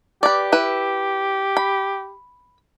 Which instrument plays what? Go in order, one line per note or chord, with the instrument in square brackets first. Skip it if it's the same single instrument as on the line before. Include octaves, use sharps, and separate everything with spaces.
[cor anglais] G4 [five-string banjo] B4 D5
[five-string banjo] E4 B4
B5